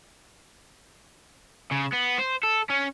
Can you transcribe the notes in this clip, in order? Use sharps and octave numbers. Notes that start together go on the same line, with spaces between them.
C#3
B3
C5
A4
C#4